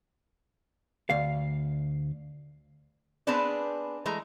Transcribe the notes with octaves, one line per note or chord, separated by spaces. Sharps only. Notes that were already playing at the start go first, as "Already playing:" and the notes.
D2 F5
B3 C4 D4 G#4 B4 D5
E3 G#3 A3 A#5